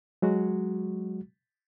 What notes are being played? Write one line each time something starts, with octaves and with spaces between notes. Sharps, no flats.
F#3 G#3 F#4